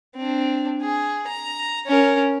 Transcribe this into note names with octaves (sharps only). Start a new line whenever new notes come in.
C4 D4
G#4
A#5
C#4 A#4